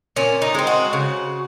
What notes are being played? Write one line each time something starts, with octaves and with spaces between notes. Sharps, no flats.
A#2 C#4
D#4
G#3 C4
F#4
C#3